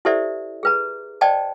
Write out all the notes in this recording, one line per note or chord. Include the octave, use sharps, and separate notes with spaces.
E4 G4 A4 C5 D5 E5
G#4 B4 A#5
C5 D5 D#5 G5 A5